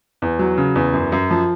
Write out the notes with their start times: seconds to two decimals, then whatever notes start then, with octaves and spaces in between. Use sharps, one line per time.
0.22 E2
0.39 F#3
0.58 C#3
0.76 E2
0.93 F#2
1.12 F#2
1.31 F3